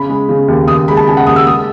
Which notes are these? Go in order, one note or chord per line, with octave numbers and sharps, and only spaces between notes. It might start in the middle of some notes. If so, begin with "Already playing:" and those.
Already playing: C#3 B5
G#3
C#3
D#2
D#2 D#6
G#3 B5
A5
C#3 G#5
F#5
D#2 D#6
E6
G#3 D#6